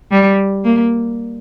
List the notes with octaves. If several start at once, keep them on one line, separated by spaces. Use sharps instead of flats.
G3
A#3